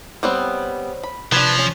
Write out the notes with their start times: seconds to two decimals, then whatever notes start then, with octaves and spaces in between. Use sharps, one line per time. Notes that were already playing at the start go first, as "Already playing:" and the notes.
0.23 G3 B3 C4 C5 C#5
1.03 B5
1.32 C3 F3 D4 B4 G#6 B6
1.59 C#4